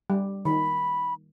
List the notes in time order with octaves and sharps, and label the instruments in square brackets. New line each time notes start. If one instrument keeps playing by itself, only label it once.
[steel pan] G3
[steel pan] D#3 [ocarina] B5